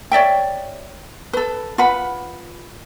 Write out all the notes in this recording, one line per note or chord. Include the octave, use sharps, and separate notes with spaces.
C#5 D5 E5 G5
A4 B4
F4 B4 F#5 B5